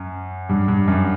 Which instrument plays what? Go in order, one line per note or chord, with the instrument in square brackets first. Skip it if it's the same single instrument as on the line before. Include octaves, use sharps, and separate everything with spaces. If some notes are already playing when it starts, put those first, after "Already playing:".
Already playing: [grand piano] F#2
G2
G2
F#2